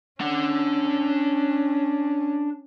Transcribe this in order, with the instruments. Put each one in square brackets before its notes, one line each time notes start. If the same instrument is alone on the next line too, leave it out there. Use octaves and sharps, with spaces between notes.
[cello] C#4 [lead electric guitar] D4 F#5